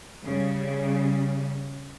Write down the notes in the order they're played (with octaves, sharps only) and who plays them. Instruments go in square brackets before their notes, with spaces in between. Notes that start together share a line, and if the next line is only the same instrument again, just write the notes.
[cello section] C#3 G3